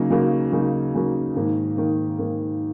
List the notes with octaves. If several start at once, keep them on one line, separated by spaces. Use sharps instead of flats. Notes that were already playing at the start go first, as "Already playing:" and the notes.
Already playing: C#3 F#3 A#3 D#4
C#3 F#3 A#3 D#4
C#3 F#3 A#3 D#4
C#3 F#3 A#3 D#4
G#2 D#3 A#3
G#2 D#3 A#3
G#2 D#3 A#3